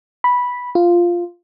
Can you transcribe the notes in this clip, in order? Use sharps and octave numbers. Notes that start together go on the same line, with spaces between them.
B5
F4